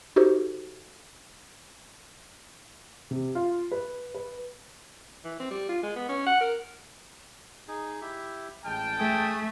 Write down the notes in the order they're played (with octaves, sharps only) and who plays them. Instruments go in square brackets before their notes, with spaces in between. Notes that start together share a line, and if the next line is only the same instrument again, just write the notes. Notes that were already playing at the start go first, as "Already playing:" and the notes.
[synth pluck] D#4 F#4 G4 A4 C5
[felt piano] C3
F4
B4
B4
[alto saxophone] E3
C4
G3
F4
G#3
B3
C#4
F#5
A#4
[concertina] D#4 G#4
E4 G4 E5
[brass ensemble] A1 G5 A5 [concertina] G#3 F6
[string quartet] A3 [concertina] G#4 G#5 D#6